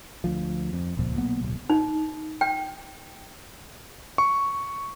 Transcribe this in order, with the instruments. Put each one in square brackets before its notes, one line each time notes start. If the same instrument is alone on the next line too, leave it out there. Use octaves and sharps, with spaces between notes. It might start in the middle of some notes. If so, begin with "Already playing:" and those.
[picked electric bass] D2 F3
F2
D#1 C#2 A#2 F3
B1 A#3 B3
D1 B1
[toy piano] D#4
G5
[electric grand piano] C#6